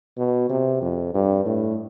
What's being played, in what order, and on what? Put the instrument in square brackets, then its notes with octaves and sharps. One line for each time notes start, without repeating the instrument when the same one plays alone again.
[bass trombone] B2
C3
F2
G2
A2